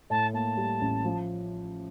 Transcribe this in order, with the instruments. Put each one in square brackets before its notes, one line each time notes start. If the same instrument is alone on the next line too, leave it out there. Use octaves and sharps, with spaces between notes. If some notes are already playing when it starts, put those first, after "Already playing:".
[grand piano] A2 [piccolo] A5
[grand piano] A#3 [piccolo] A5
[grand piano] G3
A1
F3